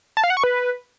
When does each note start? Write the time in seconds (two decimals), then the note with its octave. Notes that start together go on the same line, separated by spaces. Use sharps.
0.17 A5
0.24 F5
0.30 F#5
0.37 C#6
0.44 B4